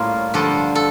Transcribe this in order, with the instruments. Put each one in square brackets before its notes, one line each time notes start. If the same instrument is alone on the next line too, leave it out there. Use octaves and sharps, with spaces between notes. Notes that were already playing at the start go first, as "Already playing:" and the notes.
Already playing: [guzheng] A2 G3 A#3 C#4 F4
G2 D3 F3 A4
A4